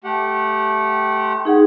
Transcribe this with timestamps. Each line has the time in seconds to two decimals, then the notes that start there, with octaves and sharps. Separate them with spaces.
0.04 A3 G4 F#5
1.12 C6
1.45 D#4 G#4 F#5